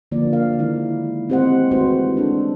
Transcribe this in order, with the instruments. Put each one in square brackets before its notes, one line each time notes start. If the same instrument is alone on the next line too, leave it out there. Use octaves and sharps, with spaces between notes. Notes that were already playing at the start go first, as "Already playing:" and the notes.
[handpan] D3 F3 A#3 D5
A#4 F5
D#3 G#3 E4
A3 C4 G4 C5 D#5 F#5
E3 G#3 D#4 F#4 B4 C5
A3 D4 A4